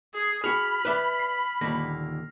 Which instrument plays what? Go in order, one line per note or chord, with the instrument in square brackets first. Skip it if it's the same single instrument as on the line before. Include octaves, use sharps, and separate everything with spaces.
[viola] G#4
[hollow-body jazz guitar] F#4 G#4 [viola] B5 [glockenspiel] F6 F7
[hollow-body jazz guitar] B4 D5 E5
[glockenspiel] C7
[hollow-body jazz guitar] D#2 A#2 D3 [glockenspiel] A#6